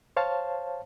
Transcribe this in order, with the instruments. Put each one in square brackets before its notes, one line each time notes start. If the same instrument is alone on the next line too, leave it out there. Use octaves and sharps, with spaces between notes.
[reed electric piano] C5 C#5 F5 A5